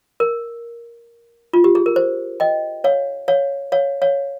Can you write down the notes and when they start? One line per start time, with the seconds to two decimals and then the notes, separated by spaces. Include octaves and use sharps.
0.20 A#4
1.53 F4
1.64 G4
1.75 G#4
1.86 A#4
1.96 C5
2.40 D#5 G5
2.84 C#5 F5
3.28 C#5 F5
3.72 C#5 F5
4.02 C#5 F5